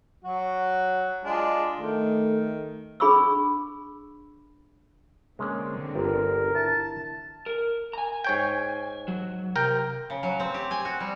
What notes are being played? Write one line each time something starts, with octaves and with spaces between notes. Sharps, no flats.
F#3 F#4
G#3 D4 F4
D#3 A3
D4 G#4 B5 C#6 E6
D3 G#3 A#3 C4 C#4
G1 A#4
E4 A5
A#4
G#5 A#5
G#2 C#5 G5
F#3
C3 A#4 G5
C#3
F#3
C4
G4
G#5
F#4
G3